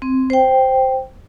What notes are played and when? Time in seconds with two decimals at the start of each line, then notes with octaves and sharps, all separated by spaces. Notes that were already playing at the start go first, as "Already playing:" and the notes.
0.02 C4
0.30 C5 G5